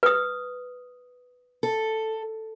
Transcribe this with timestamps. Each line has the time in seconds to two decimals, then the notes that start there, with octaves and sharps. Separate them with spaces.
0.03 B4 D#6
1.63 A4